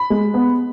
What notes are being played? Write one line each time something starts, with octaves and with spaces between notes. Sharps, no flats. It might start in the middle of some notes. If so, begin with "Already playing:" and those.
Already playing: B5
G#3
B3